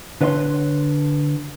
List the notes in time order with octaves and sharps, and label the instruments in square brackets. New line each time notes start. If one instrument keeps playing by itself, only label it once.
[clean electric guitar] D3 B4 C#5 E5 C6